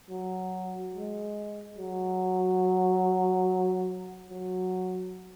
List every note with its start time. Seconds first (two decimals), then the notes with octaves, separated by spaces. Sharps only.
0.10 F#3
0.94 G#3
1.78 F#3
4.29 F#3